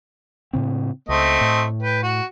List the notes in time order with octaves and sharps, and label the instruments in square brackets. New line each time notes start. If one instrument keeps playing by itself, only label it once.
[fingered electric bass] A2 C#3 C4
[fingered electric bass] C#2 [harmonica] A3 C4 D#5
[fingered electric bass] A2
[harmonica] B4 G5
F#4